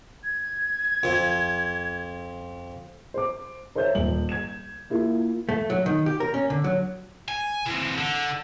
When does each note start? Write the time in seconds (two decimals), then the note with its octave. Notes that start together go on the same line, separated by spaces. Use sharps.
0.23 G#6
1.03 F2
3.14 C5 D6
3.75 A#4 C5 C#5 E5 G6
3.95 D#1 F#7
4.29 G#6 E7
4.90 A#3 E4 F4
5.49 A3
5.70 F#3
5.86 D#3
6.06 G4
6.20 A#4
6.34 C#4
6.50 D3
6.64 F#3
7.28 G#5
7.66 E3 C4
7.98 D3